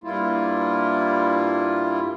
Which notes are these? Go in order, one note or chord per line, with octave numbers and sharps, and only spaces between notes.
G2 G3 A#3 E4 F4